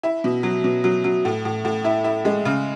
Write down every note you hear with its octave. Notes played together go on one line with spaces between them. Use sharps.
E4
B2
F#3
B2
F#3
F#3
A2
A2
A2
E4
E4
G#3
C#3